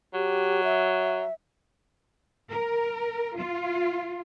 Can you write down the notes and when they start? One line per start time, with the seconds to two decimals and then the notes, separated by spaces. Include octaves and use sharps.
0.14 F#3 G4
0.64 E5
2.51 A#4
3.38 F4